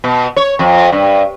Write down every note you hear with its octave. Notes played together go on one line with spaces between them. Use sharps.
B2
C#5
F2
G2